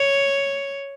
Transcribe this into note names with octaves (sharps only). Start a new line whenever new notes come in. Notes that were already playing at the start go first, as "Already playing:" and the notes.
Already playing: C#5